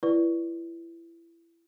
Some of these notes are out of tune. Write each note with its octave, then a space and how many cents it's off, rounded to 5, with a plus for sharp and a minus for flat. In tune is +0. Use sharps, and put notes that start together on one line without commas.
E4 +25 B4 -10 D5 +0